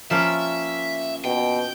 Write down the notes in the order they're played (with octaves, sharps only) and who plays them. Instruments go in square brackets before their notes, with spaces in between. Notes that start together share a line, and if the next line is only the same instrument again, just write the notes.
[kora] F3 A#3 C#4 [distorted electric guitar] E5
[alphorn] B2 [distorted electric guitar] G5